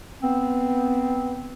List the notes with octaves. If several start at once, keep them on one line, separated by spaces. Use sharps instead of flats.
B3 C4